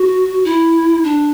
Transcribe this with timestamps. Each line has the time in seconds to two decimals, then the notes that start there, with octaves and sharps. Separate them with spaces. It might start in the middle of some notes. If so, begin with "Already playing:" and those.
Already playing: F#4
0.45 E4
1.04 D4